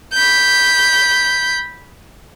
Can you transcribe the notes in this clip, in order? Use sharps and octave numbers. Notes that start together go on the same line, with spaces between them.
B5 G6